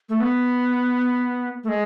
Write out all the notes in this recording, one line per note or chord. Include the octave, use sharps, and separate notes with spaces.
A3
B3
A3
G#3